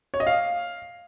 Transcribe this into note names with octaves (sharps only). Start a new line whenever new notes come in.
C#5
D#5
F5